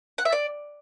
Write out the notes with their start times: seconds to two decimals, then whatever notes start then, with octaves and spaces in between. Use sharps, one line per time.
0.18 F#5
0.25 E5
0.32 D5